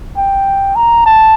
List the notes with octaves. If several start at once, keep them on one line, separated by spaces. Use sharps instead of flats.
G5
A#5
A5